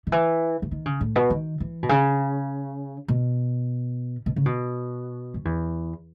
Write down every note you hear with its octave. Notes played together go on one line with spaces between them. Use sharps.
D#3
E3
E3
D#3
C#3
A2
B2
D#3
E3
B2
C#3
B2
B2
C#3
B2
F#2
E2